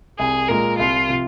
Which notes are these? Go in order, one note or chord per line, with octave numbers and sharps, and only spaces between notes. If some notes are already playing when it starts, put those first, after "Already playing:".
C2 G#4
A#2 G#3 A#4
C2 F4
C3 F3